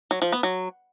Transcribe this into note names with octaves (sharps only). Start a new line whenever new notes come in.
F#3
F3
B3
F#3